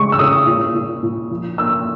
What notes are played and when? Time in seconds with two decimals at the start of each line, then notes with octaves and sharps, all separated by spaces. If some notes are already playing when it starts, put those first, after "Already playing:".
Already playing: C#3 G#3 C#6
0.12 E6
0.19 C#3 D#6
0.47 A#2
0.74 A#2
1.03 A#2
1.31 F3
1.58 A#3 E6